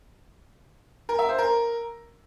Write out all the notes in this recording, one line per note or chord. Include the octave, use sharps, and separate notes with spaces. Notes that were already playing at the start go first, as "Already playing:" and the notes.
A#4
E5
C5
A#4